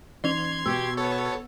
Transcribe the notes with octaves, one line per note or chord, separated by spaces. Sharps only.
E3 D#4 C6 G#6 F7
B2 G4 E6
B3 A4 C#5